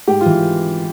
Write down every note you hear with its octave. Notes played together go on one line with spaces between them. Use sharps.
G#2 G4
F4
E3